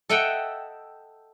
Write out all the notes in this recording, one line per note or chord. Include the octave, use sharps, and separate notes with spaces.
A4 D#5 E5 F#5 G5